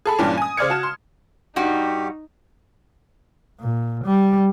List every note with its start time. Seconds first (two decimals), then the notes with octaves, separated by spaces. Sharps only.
0.05 G#4 A4 B5
0.18 G2 A#2 E3 G3 C#4 D4
0.38 G#5 D#6
0.57 C#3 C5 D5 F6 G#6 C#7
0.70 F#4 A5 E7
0.83 C6
1.56 G2 G3 D#4 F#4 G4
3.60 A#2
4.04 G3